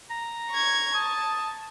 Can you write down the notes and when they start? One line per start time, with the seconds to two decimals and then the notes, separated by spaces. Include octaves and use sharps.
0.10 A#5
0.51 C#6 G#6
0.94 A5 D#6